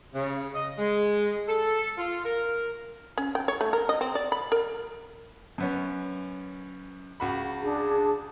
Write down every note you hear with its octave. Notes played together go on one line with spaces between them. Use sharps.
C#3
D#5
G#3
A4
F4
A#4
C#4
G5
C#5
A3
A#4
D#5
C4
D5
B5
A#4
F#2 B3 C#4
C#2 F#4 B5
D4 G#4 A5